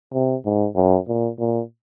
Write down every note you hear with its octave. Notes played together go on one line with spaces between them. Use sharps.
C3
G#2
F#2
A#2
A#2